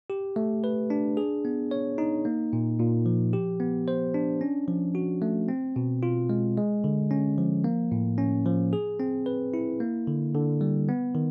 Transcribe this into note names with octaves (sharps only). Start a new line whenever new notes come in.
G4
A3
B4
D4
G#4
B3
C#5
D#4
A#3
A#2
A#2
F3
G4
B3
C5
D4
C#4
F3
F#4
A3
C4
B2
F4
G#3
G#3
D3
C#4
F3
A#3
A2
C#4
F3
G#4
C4
B4
E4
A#3
D3
D3
G3
B3
D#3